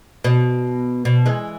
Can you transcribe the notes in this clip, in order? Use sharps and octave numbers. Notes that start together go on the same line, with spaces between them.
B2
B2
E3 G#3